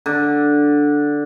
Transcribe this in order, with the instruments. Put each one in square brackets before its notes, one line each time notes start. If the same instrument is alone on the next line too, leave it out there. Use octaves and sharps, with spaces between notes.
[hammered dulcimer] D3